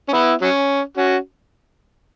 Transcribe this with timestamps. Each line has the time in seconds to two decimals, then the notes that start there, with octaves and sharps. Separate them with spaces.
0.09 C#4
0.13 B3 E4
0.41 F#3 C#4
0.97 C#4 F#4